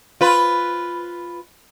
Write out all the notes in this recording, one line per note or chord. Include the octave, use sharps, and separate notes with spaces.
F4 B4